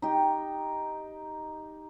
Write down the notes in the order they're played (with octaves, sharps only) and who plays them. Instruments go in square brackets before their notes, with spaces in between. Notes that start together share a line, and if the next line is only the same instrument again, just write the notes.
[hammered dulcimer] D#4 G4